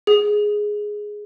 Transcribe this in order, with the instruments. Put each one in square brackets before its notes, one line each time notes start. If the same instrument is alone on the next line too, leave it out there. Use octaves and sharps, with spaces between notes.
[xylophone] G#4